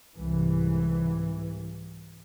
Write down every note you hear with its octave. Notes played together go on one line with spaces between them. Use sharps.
C2 G#2 E3